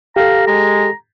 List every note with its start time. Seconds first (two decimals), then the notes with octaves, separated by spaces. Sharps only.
0.16 G4 A4 F5 A#5
0.47 G#3 A#5